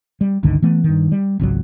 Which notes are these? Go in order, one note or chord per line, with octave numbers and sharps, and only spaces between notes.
G3
G1 C#2 D3 D#3
E3 A3 B3
G2 D#3
G3
G#1 C#2 B2 F#3